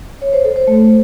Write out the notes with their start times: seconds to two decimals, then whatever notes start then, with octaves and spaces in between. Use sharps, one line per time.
0.22 C#5
0.33 C5
0.45 A4
0.56 C5
0.67 A3